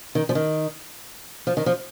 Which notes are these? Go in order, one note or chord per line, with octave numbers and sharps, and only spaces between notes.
D#3
F3
D#3
F3
D#3
F3